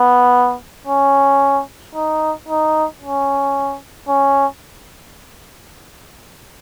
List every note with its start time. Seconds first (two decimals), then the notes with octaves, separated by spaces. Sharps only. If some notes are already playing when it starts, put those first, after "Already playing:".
Already playing: B3
0.87 C#4
1.95 D#4
2.48 D#4
3.02 C#4
4.08 C#4